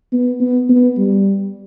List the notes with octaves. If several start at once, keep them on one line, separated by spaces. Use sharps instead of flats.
B3
B3
B3
G3